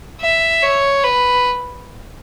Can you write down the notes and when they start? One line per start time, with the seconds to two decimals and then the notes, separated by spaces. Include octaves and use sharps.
0.20 E5
0.62 C#5
1.03 B4